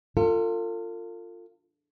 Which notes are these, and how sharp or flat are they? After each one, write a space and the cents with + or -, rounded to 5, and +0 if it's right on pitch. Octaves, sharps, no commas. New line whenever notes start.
F4 +0 A4 +40